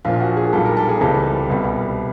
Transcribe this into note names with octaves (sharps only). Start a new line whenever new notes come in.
A#1 A#2 F3 F4
F#4
G#4
B1 A#2 G3 A4
A#4
A4
G#4
C#2 C3 E3 G3 A4
C2 B2 G3